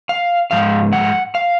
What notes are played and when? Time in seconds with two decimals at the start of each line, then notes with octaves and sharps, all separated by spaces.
0.09 F5
0.51 G#2 F3 F5
0.93 F#5
1.35 F5